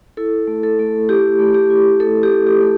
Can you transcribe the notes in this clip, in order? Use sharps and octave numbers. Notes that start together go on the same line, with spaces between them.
E4 A4
A3
A4
A3
E4 G4
A3
G4
E4
A3 A4
G4
E4
G4
A3